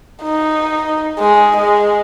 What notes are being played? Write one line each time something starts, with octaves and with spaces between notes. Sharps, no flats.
D#4
G#3
G#3